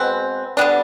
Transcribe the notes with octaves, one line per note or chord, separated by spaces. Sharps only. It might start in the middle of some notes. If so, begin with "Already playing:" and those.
Already playing: B2 G#3 C4 B4
D3 G3 B3 D4